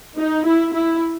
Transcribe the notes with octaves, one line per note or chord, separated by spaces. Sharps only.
D#4
E4
E4